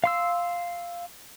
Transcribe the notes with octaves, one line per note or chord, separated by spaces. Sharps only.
F5 C6 E6